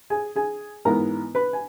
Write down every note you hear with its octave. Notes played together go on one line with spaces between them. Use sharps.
G#4 G#5
G#4 G#5
G#2 E3 B3 A#4 A#5
B4 B5
G#5